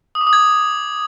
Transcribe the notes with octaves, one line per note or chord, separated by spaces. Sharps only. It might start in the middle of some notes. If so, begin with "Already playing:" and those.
D#6
D6
D#6
G#6